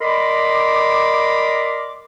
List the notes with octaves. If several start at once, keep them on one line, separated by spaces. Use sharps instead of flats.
A#4 D5 D#5 B5 C6 D6